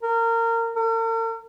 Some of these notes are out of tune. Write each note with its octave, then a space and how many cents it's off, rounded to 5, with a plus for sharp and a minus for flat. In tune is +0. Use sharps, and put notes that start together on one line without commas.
A#4 -25
A#4 -45